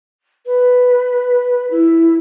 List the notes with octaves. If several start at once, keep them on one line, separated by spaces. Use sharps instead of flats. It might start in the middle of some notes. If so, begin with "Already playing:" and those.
B4
E4